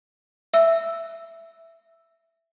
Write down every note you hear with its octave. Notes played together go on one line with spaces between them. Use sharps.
E5 E6